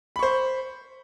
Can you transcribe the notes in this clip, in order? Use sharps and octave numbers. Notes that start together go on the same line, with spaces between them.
C5 B5 C#6